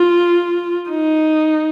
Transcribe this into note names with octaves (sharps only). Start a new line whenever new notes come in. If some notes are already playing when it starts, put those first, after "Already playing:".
Already playing: F4
D#4